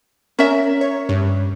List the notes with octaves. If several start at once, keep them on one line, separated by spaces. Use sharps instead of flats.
C#4 A#4 E5
C#5
G2